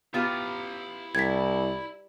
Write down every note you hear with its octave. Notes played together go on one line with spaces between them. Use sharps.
B3 E4 F4 G4 A#5
C2 G3 G#6 B6